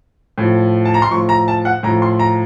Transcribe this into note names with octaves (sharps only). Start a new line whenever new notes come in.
A2 F3
A5
A#5
C6
A2 F3 C#6
A#5
A5
F#5
A2 F3 A#5
C6
A#5